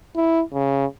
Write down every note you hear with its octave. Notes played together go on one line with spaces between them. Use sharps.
E4
C#3